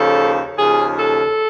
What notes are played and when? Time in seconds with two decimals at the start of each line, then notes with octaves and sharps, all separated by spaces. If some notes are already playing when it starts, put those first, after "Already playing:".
Already playing: D#2 C#3 F3 A4
0.56 D#2 C#3 F3 G#4
0.98 A4